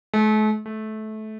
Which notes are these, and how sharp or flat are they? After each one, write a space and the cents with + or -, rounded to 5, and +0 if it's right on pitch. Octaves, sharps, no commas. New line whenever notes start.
A3 -40
A3 -20